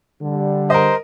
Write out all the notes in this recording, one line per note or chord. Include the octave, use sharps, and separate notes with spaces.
D3 G3
A#4 C5 D#5